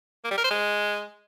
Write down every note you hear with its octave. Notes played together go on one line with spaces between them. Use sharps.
A#3
G3
A#4
C5
G#3